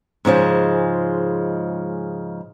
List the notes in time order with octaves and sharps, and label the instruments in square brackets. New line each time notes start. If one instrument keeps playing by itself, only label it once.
[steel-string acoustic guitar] G#2 C#3 F3 G#3